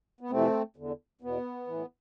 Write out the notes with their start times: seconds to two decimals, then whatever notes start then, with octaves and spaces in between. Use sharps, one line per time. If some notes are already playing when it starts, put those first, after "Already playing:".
0.21 B3
0.30 F2 C3 E3 A3 C4
0.76 E2 D3
1.21 E2 B2 B3
1.67 A2 E3